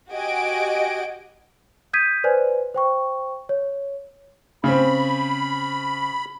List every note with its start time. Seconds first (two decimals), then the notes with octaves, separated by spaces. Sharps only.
0.10 F#4 G4 D#5 G#5 D7
1.93 D#6 G6 G#6 B6 D#7
2.24 B4 C5 D5 G#5
2.74 C5 G5 C#6
3.49 C#5
4.64 C#3 C4 B5